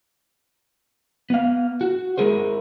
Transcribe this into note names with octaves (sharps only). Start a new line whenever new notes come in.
B3 F5
F#4
G#3 E4 G#4 A#4 C5